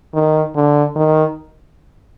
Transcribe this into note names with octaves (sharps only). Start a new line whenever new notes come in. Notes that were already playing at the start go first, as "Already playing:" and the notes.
D#3
D3
D#3